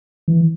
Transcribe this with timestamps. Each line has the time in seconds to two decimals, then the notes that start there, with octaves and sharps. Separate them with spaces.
0.28 E3